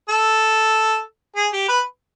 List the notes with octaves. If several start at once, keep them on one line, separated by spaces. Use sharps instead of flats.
A4
G#4
G4
B4